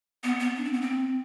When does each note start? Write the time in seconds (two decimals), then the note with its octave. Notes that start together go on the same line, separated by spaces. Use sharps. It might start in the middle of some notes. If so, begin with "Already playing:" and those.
0.24 B3
0.40 B3
0.57 D4
0.65 C4
0.73 B3
0.82 C4